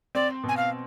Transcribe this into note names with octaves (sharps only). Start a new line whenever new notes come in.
C4 D5
B2
G#5
F5